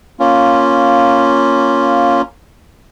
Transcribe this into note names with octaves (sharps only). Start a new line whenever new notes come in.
A#3 C#4 F4